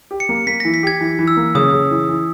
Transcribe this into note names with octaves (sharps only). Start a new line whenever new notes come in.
G4
C#7
A#3
A#3 B6
E3 A#6
B6
G4 G#6
E3
E3
E6
A#3
C#3 D#6
C#3
E3
E3